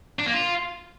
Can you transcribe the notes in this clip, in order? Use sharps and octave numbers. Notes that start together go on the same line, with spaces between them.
D4
A#3
F4